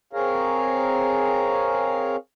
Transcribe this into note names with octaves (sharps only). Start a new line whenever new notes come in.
C4 G#4 A#4 C#5 F5 A#5